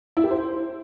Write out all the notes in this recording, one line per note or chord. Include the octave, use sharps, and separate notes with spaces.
E4
G4
C5